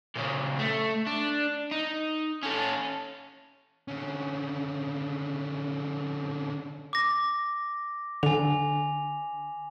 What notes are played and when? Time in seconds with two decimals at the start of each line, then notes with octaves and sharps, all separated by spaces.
0.15 A#2 C#3
0.59 A3
1.06 D4
1.71 D#4
2.43 C#4 A4
3.88 D3 C#4
6.93 D6 A#6
8.23 D3 G#5 F7